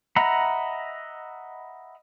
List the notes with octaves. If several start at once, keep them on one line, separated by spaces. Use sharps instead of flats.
D#5 E5 F#5 A#5 B5